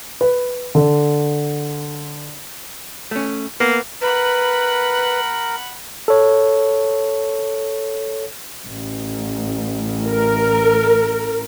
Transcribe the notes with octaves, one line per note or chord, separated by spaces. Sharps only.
B4
D3
A3 C#4
A#3 B3
A#4 B4 F#5 B5
A4 C#5
A1
A#4